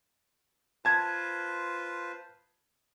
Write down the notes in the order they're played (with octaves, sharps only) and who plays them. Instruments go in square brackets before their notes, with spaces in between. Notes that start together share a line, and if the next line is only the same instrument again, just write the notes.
[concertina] F4 B4 C5 [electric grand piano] A5 G#6